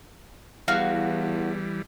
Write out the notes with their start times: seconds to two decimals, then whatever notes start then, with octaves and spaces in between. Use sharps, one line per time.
0.68 E2 E3 G3 F#4 F5